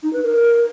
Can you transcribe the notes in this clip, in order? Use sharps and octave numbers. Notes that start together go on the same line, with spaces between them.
D#4
B4
A#4